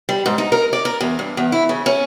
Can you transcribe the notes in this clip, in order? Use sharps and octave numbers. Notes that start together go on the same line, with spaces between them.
G3
G#2
D#4
A#4
D5
A#4
E2
G2
E2
E4
C#3
C#4